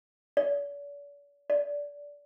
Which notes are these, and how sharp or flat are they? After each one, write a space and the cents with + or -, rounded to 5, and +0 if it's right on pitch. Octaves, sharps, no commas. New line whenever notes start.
D5 -45
D5 -20